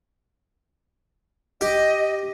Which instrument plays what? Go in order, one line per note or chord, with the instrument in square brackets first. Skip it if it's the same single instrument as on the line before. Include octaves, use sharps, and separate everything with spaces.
[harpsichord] G4 [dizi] D#5